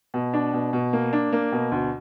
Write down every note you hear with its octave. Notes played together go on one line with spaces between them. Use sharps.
B2
D4
B2
B2
A#3
D4
A#3
B2
D2